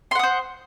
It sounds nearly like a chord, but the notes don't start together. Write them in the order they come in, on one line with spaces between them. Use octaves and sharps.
C6 F#5 D#6 C5